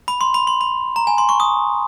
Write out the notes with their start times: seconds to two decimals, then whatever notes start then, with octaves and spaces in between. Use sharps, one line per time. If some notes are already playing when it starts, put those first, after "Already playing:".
0.08 B5
0.21 C6
0.34 B5
0.47 C6
0.61 B5
0.96 A#5
1.07 G#5
1.18 C6
1.29 C#6
1.40 D#6